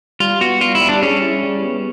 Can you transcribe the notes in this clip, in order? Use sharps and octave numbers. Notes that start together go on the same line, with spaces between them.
G3 F4
B3 F#4
G3 F4
E4
G3
D4
C#4 G#4
E4
G3
B3